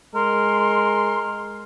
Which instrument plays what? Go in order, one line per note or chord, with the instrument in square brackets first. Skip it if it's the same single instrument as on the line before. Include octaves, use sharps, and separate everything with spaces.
[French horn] G#3 [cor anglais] A#4 [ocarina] C6